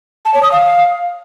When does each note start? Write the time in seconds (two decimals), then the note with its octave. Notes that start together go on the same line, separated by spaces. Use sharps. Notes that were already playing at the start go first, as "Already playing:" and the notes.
0.25 A5
0.34 C#5
0.43 D#6
0.52 F5